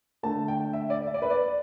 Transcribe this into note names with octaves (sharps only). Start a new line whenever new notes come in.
D3 A3 A5
G5
E5
D5
E5
D5
B4
D5